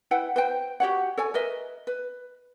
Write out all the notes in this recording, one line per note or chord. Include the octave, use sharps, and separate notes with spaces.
E4 B4 F#5 G5
B4 C5 G5
F#4 G4 C#5 F#5
A4 C#5 G#5
A#4 B4 D#5 E5
B4